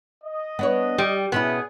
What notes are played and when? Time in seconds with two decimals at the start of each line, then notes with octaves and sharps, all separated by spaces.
0.24 D#5
0.59 B3 D4 C#5
0.98 G3 G4
1.32 B2 B3 C#4 E4 G#4